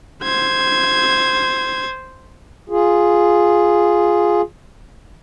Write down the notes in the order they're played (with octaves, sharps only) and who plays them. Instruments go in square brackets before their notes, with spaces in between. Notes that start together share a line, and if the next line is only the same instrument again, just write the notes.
[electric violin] C5 G#6
[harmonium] F4 G#4